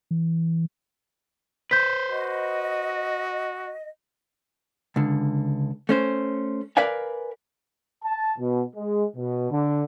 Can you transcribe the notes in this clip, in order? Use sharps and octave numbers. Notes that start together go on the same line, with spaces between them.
E3
B4 C5 G6 B6
F#4 D#5
C#2 D3
A3 C#4 C5
A#4 B4 D5 F5 G#5
A5
B2
G#3
B2
D3